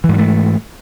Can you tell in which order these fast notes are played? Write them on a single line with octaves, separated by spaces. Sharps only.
E3 G#2 G3 A3